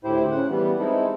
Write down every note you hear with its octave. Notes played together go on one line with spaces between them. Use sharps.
D2 A2 E4 G4 C5
C#3 F#5
E3 G3 B3
G#3 C4 D#4 E4 A4